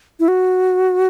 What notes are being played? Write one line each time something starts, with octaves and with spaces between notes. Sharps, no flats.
E4
F#4